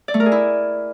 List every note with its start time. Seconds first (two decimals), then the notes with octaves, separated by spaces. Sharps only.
0.08 D5
0.14 A3
0.20 A#4
0.26 G#4
0.32 E4